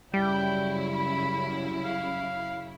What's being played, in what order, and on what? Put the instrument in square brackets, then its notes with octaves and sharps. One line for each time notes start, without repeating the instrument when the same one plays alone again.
[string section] F#2 C#3 E4 [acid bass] G3 [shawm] G5
[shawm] B5
F5